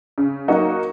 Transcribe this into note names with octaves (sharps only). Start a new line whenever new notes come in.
C#3
F#3 A#3 D#4 F#4